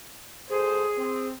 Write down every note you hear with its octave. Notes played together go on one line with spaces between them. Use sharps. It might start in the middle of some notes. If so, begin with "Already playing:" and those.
D2 G#4 A4 C5
C4